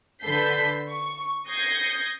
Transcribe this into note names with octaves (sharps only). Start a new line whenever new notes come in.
D3 A4 B4 G6 B6 C7
C#6
D#6 G6 G#6 A#6 C7 C#7